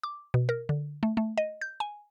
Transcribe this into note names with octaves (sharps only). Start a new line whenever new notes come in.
D6
B2
A#4
D3
A3
A3
D#5
G6
G#5